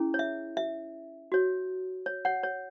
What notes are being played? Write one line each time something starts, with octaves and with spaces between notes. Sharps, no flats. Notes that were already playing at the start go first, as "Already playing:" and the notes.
Already playing: C#4 E4 G#4
C#5
E5
E5
F#4 C#5
C#5
C#5 F#5
C#5